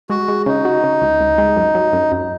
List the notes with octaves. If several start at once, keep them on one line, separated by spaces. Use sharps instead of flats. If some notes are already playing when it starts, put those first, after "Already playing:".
G#3 F#4
G#3
C#3 D#4
F#4
C#3
C#2
C#2
G#3
F#2
F#3
F#2
F#2